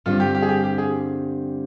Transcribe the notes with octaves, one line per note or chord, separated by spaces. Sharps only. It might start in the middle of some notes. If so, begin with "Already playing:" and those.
G2 D3 G3 C4 F4
G4
G4
G#4
G4
G4
G#4